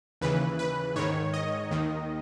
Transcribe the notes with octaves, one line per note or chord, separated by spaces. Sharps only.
D#2 C#3 E3 B4
B4
G#2 D#3 C#5
D#5
D#2 D#3